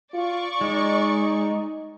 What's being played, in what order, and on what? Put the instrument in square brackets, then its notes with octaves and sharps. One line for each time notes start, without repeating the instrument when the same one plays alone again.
[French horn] F4 [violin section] D5 C#6
[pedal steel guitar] G#3 [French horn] D#4